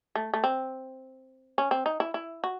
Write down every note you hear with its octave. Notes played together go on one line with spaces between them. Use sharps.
A3
A3
C4
C#4
C4
D#4
E4
E4
F#4